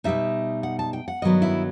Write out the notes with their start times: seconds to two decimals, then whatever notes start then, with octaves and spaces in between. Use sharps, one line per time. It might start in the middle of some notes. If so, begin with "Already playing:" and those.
0.04 B2 G3 D#4 E5
0.63 F#5
0.79 A5
0.93 G5
1.08 F#5
1.22 G2 D#3 F#3 B3 D#5
1.42 E4